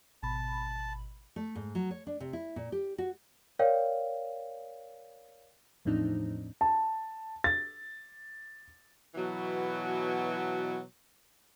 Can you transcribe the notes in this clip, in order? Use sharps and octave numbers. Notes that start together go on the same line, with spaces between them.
G#1 B2 A5 B5
A3
G#2
F#3
C#5
D4
C3
E4
A#2
G4
F#4
A#4 C#5 D5 F5 G5
E2 A2 F3 C4 D4 D#4
A5
A6
B2 E3 F#3